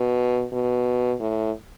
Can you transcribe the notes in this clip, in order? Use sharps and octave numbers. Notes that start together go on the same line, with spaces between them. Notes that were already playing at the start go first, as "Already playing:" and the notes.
Already playing: B2
B2
A2